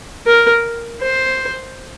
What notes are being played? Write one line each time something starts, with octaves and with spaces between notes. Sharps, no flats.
A#4
C5